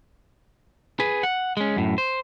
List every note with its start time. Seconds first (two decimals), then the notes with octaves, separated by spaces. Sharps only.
1.00 G#4 B4
1.23 F#5
1.57 G#3 C#4
1.77 F#2 A2
1.98 C5